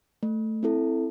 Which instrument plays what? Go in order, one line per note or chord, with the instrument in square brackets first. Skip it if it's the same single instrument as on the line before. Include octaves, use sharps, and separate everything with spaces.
[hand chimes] A3
C4 E4 A4